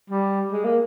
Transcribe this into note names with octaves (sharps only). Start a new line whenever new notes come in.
G3
G#3
A#3